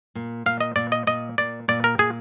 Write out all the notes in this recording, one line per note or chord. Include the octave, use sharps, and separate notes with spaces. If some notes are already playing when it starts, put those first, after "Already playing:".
A#2
A#2 F5
D#5
A#2 D5
D#5
A#2 D#5
A#2 D5
A#2 D5
A#4
A#2 G#4